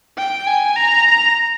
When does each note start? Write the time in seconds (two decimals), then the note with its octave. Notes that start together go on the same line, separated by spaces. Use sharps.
0.18 G5
0.47 G#5
0.76 A#5